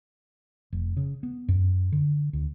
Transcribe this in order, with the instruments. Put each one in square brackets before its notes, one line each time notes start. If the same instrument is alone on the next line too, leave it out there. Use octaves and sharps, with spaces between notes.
[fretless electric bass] F1
C#3
B3
F#2
D3
D2